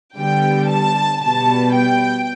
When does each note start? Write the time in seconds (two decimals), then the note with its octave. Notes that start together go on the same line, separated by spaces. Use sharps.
0.18 D3 G3 B3 G5
0.70 A5
1.22 B2 G3 B3 A5
1.74 G5